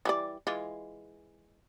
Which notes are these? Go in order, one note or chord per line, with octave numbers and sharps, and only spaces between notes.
E3 G3 D5
E3 G#3 F4